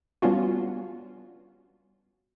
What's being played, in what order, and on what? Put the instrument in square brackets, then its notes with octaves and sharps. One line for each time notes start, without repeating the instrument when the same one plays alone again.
[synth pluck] G3 B3 C#4 D4 F4 F#4